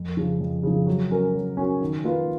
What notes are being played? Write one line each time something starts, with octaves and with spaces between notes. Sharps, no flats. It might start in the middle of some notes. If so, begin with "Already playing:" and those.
Already playing: F2
C#3 F3
F2
C#3 F3
F#3
C#4 F#4 A#4
F#3
C#4 F#4 A#4
D#3
A#3 F4 B4